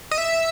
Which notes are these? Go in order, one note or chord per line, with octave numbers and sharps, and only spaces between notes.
D#5
E5